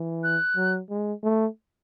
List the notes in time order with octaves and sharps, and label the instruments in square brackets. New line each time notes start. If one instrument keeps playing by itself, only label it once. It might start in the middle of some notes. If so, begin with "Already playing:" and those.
Already playing: [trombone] E3
[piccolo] F#6
[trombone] F#3
G#3
A3